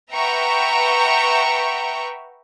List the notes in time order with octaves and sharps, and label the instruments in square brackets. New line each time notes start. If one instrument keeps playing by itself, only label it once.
[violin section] B4 E5 F#5 G5 A#5 C#6